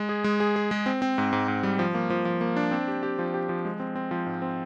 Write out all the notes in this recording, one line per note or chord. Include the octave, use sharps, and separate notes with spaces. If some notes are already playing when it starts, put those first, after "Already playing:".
Already playing: G#3
G#4
G#3
G#4
G#4
G#3
C4
C4
G#2
G#2
G#2
G3
F3
A#3
F3
F3
A#3
D4
C4
G4
G4
F3
G4
F3
G#3
C4
C4
F3
G#2
C4